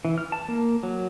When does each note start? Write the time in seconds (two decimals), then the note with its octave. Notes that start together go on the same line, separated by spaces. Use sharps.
0.05 E3
0.18 F6
0.32 A5
0.48 A#3
0.83 F#3